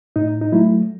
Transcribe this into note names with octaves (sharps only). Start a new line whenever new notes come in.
A2 D#4
D#4
F#3 A3 E4